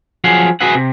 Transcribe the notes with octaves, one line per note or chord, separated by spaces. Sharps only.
F3 F#3 G#4 F5 F#5
F#4 G#4 B4 E5 F#5
C3